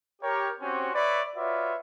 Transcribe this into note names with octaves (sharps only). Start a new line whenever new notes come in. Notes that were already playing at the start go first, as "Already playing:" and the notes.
G4 A#4 C#5
C4 C#4 F#4 G4 C5
B4 C#5 D5 E5 B5
F4 F#4 B4 C#5 D5 E5